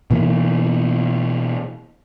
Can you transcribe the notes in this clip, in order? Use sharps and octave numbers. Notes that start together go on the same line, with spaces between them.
B2 E3 A#3